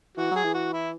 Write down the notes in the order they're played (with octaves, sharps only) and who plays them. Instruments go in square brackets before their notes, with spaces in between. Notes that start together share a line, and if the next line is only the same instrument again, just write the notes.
[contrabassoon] E3 [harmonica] F#4
[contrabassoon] F#3
[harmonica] G#4
[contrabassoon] E3
[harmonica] F#4
E4